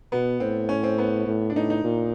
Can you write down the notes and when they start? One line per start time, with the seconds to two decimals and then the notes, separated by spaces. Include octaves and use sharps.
0.12 B2 B3
0.40 A2 C4
0.69 C#4
0.83 C4
0.98 B3
1.27 A2
1.50 D4
1.55 A2 D#4
1.70 D#4
1.84 A#2